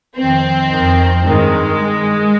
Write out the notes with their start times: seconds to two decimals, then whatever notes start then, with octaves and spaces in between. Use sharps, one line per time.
0.17 F2 D#3 C4
0.70 F2 D#3
1.25 G2 D#3 G#3